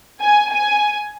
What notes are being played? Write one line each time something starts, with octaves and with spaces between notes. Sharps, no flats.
G#5
G#5